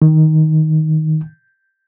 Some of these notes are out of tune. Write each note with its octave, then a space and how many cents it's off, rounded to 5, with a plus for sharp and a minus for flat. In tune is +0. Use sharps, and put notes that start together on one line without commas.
D#3 +5